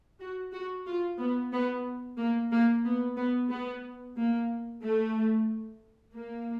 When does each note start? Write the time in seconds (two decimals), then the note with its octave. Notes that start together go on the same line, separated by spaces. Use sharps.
0.20 F#4
0.52 F#4
0.86 F4
1.19 B3
1.52 B3
2.17 A#3
2.51 A#3
2.85 B3
3.17 B3
3.50 B3
4.16 A#3
4.83 A3
6.14 A#3